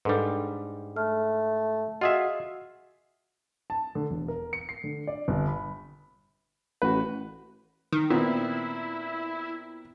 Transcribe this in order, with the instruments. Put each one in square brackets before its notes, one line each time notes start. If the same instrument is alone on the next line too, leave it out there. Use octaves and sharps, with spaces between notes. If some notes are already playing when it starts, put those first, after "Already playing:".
[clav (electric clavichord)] G#2 G3 [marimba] D4 A4 B4
[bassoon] A3 [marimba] F6
[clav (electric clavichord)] F4 G#4 E5 [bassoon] F#4 [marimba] D#5
[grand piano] A5
D3
E1
A#4
C#7
C7
D3
D5
G1
B5
[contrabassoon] A1 [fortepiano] F#4 B4
[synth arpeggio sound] D#3
[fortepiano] A#2 B3 C4 [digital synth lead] E4
[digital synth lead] E4